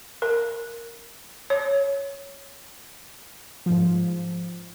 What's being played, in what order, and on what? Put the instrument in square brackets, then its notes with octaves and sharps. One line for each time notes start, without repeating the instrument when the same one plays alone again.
[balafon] A#4
C#5
[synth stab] G#2 F3